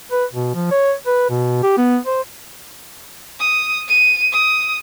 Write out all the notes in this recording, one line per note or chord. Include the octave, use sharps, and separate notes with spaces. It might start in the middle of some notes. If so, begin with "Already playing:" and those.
B4
B2
F3
C#5
B4
B2
G4
B3
C5
D#6
D#7
D#6